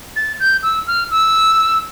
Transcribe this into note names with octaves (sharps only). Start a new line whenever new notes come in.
A6
G6
E6
F6
E6